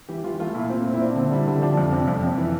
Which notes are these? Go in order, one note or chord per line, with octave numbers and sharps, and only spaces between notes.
E3 G4
E3 F4
A3 F4
A#2 E4
C4
A#2
E4
C4 D4
D3
G3 E4
D3
F3 D4
F2
C3
F2
F2
E3